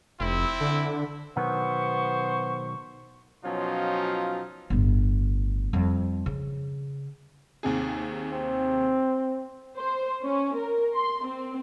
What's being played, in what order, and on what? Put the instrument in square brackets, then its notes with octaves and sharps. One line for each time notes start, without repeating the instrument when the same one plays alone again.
[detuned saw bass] F1 [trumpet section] C4 E4
[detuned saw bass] D3
[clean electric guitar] B2 D#3 F#3 [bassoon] B3 [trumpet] C5 [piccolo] C#6
[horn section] B2 F3 F#3 C#4 D#4 F4
[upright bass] G1 A2
F2 G3
C#3
[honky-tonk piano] D#2 C3 G#4
[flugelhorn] C4
[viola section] C5
C#4
A#4
C6
C4